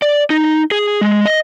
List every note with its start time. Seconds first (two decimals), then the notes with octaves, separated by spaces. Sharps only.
0.02 D5
0.30 D#4
0.71 G#4
1.01 G#3
1.25 D#5